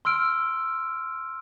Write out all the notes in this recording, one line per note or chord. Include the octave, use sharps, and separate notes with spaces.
C6 E6 F6 D7